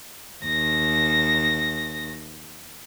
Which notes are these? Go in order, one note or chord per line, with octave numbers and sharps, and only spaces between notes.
D#2 A#6